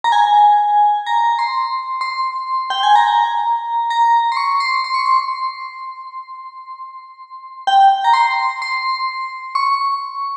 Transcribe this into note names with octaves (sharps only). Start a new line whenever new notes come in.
A#5
G#5
A#5
C6
C6
G5
G#5
A#5
A#5
C6
C#6
C6
C6
C#6
C6
G5
A#5
C6
C6
C#6